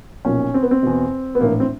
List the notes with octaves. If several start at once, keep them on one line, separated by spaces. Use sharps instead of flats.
B1 A#2 F3 C#4
C4
B3
C4
E2 B2
B3
A#1 A2 E3 A#3
C4